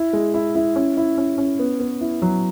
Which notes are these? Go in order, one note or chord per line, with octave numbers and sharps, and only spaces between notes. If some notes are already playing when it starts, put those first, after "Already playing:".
Already playing: E4
G#3
E4
E4
C#4
E4
C#4
C#4
B3
B3
E4
F#3